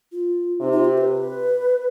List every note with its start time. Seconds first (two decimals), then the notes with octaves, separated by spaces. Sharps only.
0.12 F4
0.60 C3 D#4
0.72 F4
0.85 G4
0.98 C5
1.01 B4